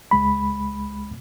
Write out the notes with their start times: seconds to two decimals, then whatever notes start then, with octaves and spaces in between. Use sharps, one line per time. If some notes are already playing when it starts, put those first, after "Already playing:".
0.11 C#2 G#3 B5